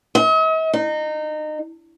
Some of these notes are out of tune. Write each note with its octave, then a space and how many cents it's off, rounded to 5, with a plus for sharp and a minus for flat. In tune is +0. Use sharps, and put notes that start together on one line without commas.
D#5 +45
D#4 -25